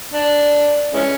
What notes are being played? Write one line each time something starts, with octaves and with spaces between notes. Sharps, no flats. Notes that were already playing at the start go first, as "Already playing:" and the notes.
D4
E3 G#3 C#4